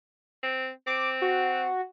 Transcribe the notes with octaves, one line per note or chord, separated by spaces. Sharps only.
C4
C4 D6
F#4